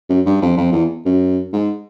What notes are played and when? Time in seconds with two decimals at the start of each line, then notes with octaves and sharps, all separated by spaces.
0.10 F#2
0.26 G2
0.42 F2
0.57 F2
0.72 E2
1.05 F#2
1.53 G#2